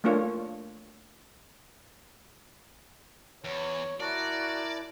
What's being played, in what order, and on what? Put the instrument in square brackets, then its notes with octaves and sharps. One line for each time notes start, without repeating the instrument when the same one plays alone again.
[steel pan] A3 A#3 D4 F4 C#5
[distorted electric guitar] E2 [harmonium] C#5
[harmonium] E4 [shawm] F#4 [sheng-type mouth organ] A#4 A5 [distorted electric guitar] D5